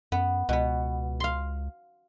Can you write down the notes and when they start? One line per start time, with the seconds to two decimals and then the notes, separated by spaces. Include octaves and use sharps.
0.12 F#2 B3
0.49 C#2 B2 B3
1.20 F5 C6